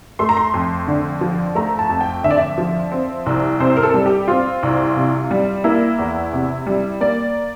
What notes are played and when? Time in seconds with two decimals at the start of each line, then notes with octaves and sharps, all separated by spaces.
0.19 A3 C6
0.29 A#5
0.37 C6
0.54 F2
0.87 D3
1.21 F3
1.55 A3 A#5
1.79 A5
1.90 F2
2.01 G5
2.24 D3 E5
2.31 D5
2.38 E5
2.58 F3
2.92 C4
3.26 C2
3.60 C3 C5
3.77 A#4
3.83 A4
3.94 G3
4.06 G4
4.28 C4 F4
4.63 C2
4.96 C3
5.31 G3
5.64 A#3 E4
5.99 E2
6.33 C3
6.67 G3
7.01 A#3 D5